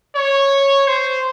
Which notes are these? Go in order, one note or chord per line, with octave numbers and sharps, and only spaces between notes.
C#5
C5